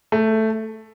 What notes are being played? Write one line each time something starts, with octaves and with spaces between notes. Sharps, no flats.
A3